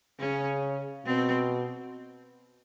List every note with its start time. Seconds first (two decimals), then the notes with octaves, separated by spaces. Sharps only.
0.20 C#3 C#4
1.05 B2 C4